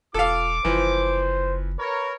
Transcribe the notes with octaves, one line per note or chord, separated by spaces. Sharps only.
E1 F4 A4 F5 D6
F#1 E3 F3 C5
A#4 B4 C#5